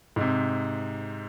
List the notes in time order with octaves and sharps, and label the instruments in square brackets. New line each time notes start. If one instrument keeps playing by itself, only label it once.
[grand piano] G#2 C3